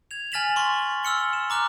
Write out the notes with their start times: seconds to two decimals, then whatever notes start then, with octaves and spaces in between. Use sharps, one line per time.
0.11 G#6 F7
0.32 G#5 F6 A6 B6 E7 F#7
0.56 C6 C#6
1.03 E6 F6 C#7 G7
1.33 E7
1.50 A#5 D6 F6 F#6